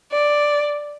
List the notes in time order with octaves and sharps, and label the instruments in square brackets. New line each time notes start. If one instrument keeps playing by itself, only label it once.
[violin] D5